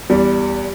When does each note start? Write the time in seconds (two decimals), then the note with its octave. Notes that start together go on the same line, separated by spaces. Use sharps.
0.10 E2 G3